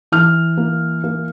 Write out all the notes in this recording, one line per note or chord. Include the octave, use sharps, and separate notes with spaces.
E3 F6
A#3
A#3